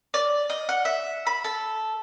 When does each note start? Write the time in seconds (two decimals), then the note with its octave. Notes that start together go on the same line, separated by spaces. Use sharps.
0.14 D5
0.50 D#5
0.69 F#5
0.85 E5
1.27 B5
1.44 A4